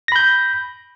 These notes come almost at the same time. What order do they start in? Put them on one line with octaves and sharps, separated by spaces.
A#6 B5 G6